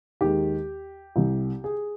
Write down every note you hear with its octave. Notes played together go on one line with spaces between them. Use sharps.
D#2 D#3 G#3 G4
C2 C3 G3
G#4